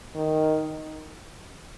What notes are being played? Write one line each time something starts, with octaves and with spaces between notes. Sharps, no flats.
D#3